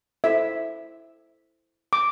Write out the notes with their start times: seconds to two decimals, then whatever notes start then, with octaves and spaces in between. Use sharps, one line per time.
0.24 E4 A4 C5 E5
1.93 D6